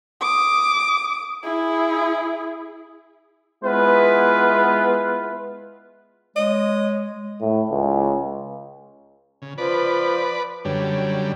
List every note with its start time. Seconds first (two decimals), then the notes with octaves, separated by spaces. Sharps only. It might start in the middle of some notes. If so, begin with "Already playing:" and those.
0.21 D6 D#6
1.44 E4 G#4
3.63 G#3 B3 E4 F4 B4
6.36 G#3 C#5 D#5
7.41 A2
7.70 C#2
9.42 C#3
9.58 F3 B4 D5
10.65 F#2 D3 G3 C#5